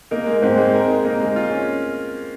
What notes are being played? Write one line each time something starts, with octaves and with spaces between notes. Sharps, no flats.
A#3 D#4 A#4
G#3
G#2 C4 C5
G#3
A#4
D#4
A#3 D#4 A#4
G#3
F4
C#4